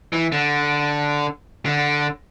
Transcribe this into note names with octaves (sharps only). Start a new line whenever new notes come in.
E3
D3
D3